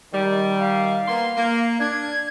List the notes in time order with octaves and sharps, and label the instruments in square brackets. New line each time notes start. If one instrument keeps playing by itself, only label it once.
[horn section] D#3 G3
[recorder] F5
[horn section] A#3 B3 C6
A#3
[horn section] D4 [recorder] G#6